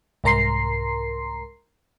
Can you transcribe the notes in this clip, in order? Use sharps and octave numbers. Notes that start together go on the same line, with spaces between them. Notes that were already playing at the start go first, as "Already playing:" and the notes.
C2 G#2 A#4 A#5 C6 C7